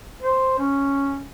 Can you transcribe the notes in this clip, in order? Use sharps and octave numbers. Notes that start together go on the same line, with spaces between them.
C5
C#4